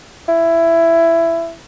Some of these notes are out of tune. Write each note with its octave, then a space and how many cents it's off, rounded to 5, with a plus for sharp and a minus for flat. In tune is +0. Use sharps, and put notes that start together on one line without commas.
E4 +15